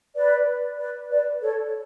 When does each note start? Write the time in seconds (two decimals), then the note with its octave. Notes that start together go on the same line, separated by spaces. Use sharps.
0.15 B4 D5
0.79 B4 D5
1.10 B4 D5
1.42 A4 C#5